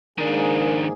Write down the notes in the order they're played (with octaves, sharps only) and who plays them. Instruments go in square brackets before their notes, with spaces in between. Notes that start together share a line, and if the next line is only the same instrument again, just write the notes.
[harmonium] G#2 A#3 G#4 [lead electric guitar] D#3 D4 [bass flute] A#4